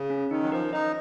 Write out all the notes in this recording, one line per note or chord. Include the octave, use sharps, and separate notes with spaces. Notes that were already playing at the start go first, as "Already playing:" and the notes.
Already playing: C#3
C#4
D#3 D#4
F#3
F3 A#4
D#4 D#5